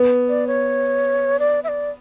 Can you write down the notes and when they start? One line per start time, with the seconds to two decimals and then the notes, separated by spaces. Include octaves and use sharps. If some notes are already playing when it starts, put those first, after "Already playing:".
Already playing: B3
0.29 D5
0.47 C#5
1.40 D5
1.64 E5
1.68 D5